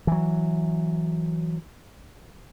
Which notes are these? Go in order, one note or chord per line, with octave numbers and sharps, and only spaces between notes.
E3 F#3